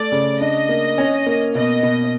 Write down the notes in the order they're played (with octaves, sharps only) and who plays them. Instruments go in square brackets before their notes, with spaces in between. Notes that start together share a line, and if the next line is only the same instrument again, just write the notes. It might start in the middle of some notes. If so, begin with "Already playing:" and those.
Already playing: [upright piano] A3 [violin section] D5
[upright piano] C#3
[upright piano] D4 [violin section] D#5
[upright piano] A#3
C#4
A#3
[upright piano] B2 [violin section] D#5
[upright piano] B2